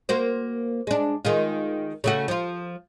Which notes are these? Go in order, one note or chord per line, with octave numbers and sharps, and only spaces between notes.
A#3 F#4 C5
G#3 D4
D#3 G#3 F4
C#3 A3 F#4
F3 F4